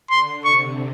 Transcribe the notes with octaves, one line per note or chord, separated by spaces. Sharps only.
D3 C6
C3 C#6